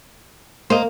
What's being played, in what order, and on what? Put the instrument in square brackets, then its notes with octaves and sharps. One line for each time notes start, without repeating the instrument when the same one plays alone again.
[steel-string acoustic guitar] A#3 [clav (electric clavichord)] C5 D#5